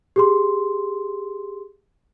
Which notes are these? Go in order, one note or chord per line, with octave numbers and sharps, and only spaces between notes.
G4 G#4 C6